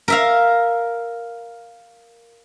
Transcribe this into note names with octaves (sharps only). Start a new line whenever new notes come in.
A#4 E5 F5